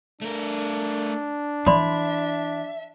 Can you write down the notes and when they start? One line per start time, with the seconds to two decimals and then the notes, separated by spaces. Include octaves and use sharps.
0.21 A3 D4 A#4
1.67 E3 D5 E5 B5 C6